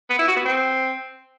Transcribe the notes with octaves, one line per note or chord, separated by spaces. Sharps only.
B3
E4
F#4
B3
C4